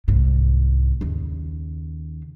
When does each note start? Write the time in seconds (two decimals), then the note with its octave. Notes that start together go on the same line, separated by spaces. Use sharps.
0.08 C2 G#2
1.01 D#2 C#3